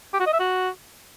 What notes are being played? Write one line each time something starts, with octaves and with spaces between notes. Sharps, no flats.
G4
F#4
D#5
E5
F#4